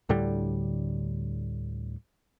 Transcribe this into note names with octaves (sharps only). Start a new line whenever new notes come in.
D2 A2 D3 G3